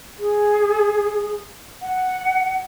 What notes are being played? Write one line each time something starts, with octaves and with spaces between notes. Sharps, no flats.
G#4
F#5